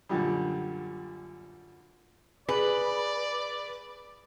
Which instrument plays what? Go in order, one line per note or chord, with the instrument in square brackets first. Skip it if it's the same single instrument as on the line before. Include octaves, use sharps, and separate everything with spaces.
[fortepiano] F#2 A#2 D3 F3 G3
[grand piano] G#4 [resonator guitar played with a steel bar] B4 [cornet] D5